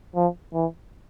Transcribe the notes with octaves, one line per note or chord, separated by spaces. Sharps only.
F3
E3